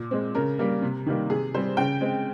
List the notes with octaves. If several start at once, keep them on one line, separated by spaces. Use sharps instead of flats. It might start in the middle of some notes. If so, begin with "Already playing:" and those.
Already playing: A#2
G#3 C4
C#3 A#4
G3 A#3
C3
D#3 G3 A#3
C3 G#4
G3 C4 C5
C#3 G5
G#3 C4